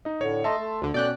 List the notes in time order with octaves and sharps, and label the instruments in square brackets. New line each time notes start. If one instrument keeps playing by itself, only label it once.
[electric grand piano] D#4 D#5
[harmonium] A2 D3 [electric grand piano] C#5
[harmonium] A3 D#4 D#5 [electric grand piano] E5 A5 C6
[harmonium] A3
[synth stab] D2 D3
[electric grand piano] B2 C#4 [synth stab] D5 G5 F#6